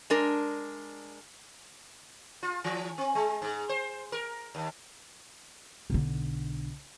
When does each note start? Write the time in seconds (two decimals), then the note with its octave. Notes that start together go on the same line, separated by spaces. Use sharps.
0.10 G#3 D4 A#4
2.43 F4
2.64 E3
2.98 C4
3.15 G#3
3.42 G#2
3.69 C5
4.12 A#4
4.55 D#2
5.90 B1 D3